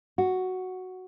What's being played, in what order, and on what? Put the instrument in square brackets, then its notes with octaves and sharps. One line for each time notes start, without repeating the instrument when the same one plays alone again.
[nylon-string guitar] F#4